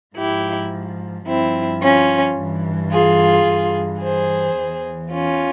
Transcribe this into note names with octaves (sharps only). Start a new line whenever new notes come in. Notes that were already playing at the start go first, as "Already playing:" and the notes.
G#2 F3 E4 G4
G2 F3 C4 E4
C#4 F4
G2 E3
F4 G#4
G2 E3
G#4 C5
E2 E3
C#4 F4